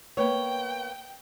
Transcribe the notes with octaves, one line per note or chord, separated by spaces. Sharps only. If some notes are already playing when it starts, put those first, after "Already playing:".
A#3 B3 C#5 G5